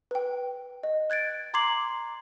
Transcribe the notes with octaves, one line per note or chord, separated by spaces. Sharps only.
B4 G5
D#5
F#6 G#6 A6 D7
A#5 C6 D6 G#6 C7 F#7